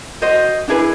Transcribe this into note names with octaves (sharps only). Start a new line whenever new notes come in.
F#4 C5 D#5
D4 E4 G#4 B4